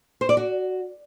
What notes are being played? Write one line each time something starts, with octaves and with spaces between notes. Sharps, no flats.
C5
D5
F#4